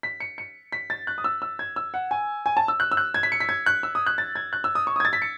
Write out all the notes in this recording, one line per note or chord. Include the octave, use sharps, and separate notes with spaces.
B6
C#7
C#7
B6
A6
F#6
D#6
E6
E6
G#6
E6
F#5
G#5
G#5
A5
E6
F#6
E6
F#6
G#6
B6
C#7
B6
G#6
F#6
E6
D#6
F#6
A6
G#6
F#6
E6
D#6
C#6
D#6
G#6
A6
B6
C#7